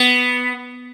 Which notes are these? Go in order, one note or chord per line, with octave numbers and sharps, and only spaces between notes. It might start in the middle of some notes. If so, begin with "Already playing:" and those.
Already playing: B3